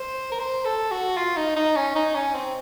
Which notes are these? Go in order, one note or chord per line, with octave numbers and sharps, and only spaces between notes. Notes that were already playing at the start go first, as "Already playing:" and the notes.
Already playing: C5
A#4
C5
A4
F#4
F4
D#4
D#4
C#4
D#4
C#4
C4